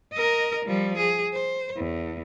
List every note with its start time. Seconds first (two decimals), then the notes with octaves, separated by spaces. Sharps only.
0.13 A#4 D#5
0.65 F3 G3
0.98 G#4
1.34 C5
1.77 E2